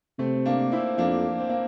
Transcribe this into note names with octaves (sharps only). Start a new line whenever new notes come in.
C3 A3 C4
A#3 D4
C4 E4
F2 A#3 D4
C4
A#3